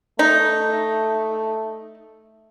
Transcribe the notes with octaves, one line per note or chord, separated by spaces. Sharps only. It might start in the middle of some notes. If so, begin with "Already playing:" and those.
A3 D#4